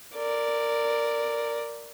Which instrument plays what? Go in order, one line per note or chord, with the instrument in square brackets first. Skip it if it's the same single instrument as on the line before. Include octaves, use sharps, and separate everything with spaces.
[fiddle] A#4 D5